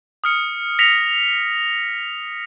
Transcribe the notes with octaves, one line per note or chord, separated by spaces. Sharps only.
D#6 F6 C#7
A#6 B6 C#7 F7